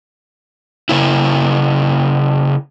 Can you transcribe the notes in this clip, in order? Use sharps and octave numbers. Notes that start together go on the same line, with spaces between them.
C#3 A#3 E4